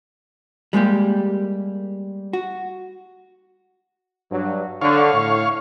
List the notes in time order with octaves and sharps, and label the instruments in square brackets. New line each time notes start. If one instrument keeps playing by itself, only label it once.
[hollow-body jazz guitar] G3 G#3 A#3 G4
F#4
[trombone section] G2 F#3
[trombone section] D3 [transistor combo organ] C#5 F5
[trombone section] A2